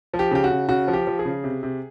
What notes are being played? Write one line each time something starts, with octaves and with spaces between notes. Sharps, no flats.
F3
G4
C#3 G4
F#4
C#3
C#3 F#4
F3
G4
F3
G#4
C#3
C3
C3